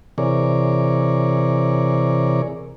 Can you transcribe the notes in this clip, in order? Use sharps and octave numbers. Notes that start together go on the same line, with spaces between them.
C3 E3 G#4 A#4 C#5 D5